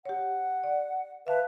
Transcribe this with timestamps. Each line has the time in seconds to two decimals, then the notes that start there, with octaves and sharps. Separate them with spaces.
0.05 G4 C#5 F#5
0.64 D5
1.27 B4 E5 F5 A5